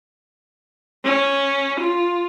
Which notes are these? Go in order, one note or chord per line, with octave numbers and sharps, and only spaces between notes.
C#4
F4